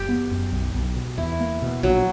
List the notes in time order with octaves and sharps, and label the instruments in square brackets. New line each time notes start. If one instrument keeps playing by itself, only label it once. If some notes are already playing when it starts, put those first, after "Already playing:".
Already playing: [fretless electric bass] F#1 [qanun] G4
[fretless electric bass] B3
F#2
B1
B1
B2
[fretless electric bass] E2 [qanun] E4
[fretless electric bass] A#3
B2
[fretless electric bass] A#1 [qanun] F#3